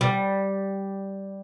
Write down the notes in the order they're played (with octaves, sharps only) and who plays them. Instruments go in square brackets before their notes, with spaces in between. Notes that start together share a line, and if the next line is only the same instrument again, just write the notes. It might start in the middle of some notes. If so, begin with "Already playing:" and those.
[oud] G3